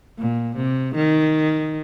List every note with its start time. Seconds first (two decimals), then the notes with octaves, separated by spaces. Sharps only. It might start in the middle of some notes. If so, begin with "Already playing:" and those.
0.18 A#2
0.57 C3
0.95 D#3